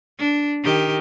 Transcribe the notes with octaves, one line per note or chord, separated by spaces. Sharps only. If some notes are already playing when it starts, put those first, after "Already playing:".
D4
D#3 G4